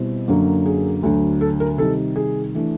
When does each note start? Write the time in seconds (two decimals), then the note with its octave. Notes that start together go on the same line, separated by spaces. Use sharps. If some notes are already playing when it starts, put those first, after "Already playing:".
Already playing: B2 G3 C4 E4
0.28 F#2 D3 F#3 A#3
0.66 G#4
1.03 D2 D3 F#3
1.41 A4
1.60 A#4
1.78 C3 D#3 G3 A4
2.16 G#4
2.54 E3 A3 D4